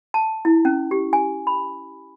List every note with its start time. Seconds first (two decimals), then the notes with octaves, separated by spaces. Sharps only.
0.14 A5
0.45 E4
0.65 C#4
0.91 G4
1.13 G#5
1.47 B5